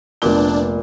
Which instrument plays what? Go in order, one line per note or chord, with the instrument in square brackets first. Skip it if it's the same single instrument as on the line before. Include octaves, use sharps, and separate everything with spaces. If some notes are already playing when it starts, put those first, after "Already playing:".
[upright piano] F1 B3 G7 [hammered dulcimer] A#2 [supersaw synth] D4